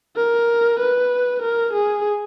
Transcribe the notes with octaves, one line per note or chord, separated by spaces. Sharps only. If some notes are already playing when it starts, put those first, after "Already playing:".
A#4
B4
A#4
G#4